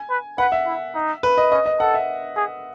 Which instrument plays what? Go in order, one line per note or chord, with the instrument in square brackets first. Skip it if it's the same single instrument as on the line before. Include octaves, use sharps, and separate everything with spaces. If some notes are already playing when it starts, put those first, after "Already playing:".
Already playing: [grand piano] G#5
[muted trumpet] B4
[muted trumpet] B4 [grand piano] F#5
[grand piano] E5
[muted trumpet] E4
D#4
[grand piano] B4
D#5
[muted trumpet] C#4 [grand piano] D#5
[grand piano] D#5
[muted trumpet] A4 [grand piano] F#5
[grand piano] E5
[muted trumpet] G#4